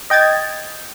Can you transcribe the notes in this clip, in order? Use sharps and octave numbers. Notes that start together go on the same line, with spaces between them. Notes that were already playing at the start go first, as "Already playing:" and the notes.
D#5 G5 G#6 A6